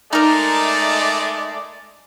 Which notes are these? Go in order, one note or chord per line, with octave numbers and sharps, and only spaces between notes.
G#3 A3 D#4 A#4 D5